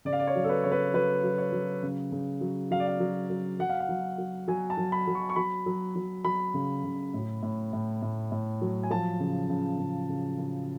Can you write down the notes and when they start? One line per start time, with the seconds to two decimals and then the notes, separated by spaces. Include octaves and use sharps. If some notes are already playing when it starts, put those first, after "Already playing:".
0.05 C#3 D5
0.13 F5
0.19 D5
0.27 C#5
0.36 F#3
0.44 A4
0.49 B4
0.64 C#3 C#5
0.72 B4
0.94 F#3 B4
1.24 F#3
1.38 C#5
1.52 F#3
1.83 C#3
2.12 C#3
2.41 F#3
2.71 F#3 F5
2.80 D5
2.87 F5
3.00 F#3
3.30 F#3
3.59 F#3 F#5
3.69 F5
3.80 F#5
3.89 F#3
4.18 F#3
4.48 F#3 G#5
4.70 A5
4.77 F#3
4.92 B5
5.07 F#3
5.15 C#6
5.30 C#6
5.36 F#3 B5
5.66 F#3
5.96 F#3
6.25 F#3 B5
6.54 C#3
6.84 C#3
7.14 A2
7.43 A2
7.73 A2
8.02 A2
8.32 A2
8.62 F#3
8.83 G#5
8.90 F3 A5
9.20 C#3
9.49 C#3
9.79 C#3
10.09 C#3
10.39 C#3